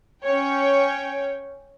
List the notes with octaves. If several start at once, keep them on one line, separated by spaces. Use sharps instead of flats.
C#4 C#5 G5